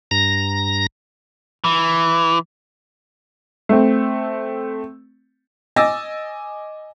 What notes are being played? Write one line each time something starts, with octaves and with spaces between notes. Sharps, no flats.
G2 A#5 A#6
E3
A3 C4
D#5 G#5 D6 E6 A6 A#6